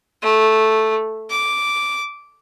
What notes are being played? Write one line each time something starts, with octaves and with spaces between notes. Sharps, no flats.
A3
D6